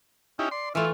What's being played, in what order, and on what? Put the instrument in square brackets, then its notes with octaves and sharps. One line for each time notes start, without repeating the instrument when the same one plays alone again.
[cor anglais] C#4 [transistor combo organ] D#4 E4 G4
[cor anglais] D5 [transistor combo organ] C6
[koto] E3 A3 [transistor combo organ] E4 [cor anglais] F4